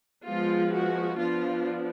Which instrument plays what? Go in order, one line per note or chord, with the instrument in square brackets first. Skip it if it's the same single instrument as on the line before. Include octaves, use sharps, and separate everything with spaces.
[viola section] F3 G#3 B3 F4
F#4
F3 B3 D4 F4